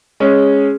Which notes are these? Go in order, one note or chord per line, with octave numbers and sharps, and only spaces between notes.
G#3 C#4